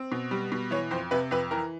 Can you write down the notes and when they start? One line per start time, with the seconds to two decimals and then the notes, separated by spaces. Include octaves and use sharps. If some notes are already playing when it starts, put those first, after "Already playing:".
Already playing: C4
0.12 B2
0.31 G3
0.52 B2
0.71 E3 C#5
0.91 F2 C5
1.11 C3 B4
1.31 F2 B4
1.51 E3 A#4